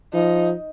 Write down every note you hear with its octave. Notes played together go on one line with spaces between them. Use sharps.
F3 D#4